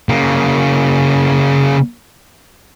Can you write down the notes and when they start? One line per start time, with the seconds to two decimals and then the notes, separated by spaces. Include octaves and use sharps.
0.09 C#3 A#3